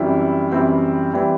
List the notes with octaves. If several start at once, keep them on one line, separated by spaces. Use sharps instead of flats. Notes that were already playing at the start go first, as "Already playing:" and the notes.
Already playing: F#2 E3 G3 C4 E4
F#2 E3 G3 C4 E4
E3 G3 C4 E4